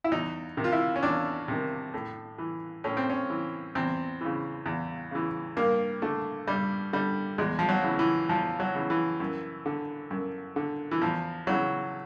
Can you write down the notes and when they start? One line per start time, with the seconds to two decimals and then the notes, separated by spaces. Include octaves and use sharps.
0.04 E4
0.12 E2 D#4
0.57 C3 D#3
0.64 F4
0.72 E4
0.96 C#4
1.03 E2 D4
1.48 C3 D#3
1.94 A2
2.38 E3
2.84 A2 C#4
2.97 C4
3.10 C#4
3.30 E3
3.75 E2 C4
4.21 C#3 E3
4.66 E2
5.11 C#3 E3
5.57 G2 A#3
6.02 D3 A3
6.47 G2 G3
6.93 D3 G3
7.38 E2 G#3
7.59 F3
7.69 F#3
7.83 C#3 E3
7.99 E3
8.29 E2 F3
8.60 F#3
8.75 C#3 E3
8.90 E3
9.20 F#2
9.66 D3
10.11 F#2
10.56 D3
10.91 E3
11.01 E2 F3
11.47 C#3 E3 F#3